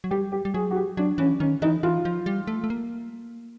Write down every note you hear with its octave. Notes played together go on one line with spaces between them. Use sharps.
F#3
G3 G4
G4
G3
F#3 G#4
F#4
G4
F#3 D4
E3 C#4
D#3 C#4
E3 D#4
E3 F4
F3
G3
A3
A3
A#3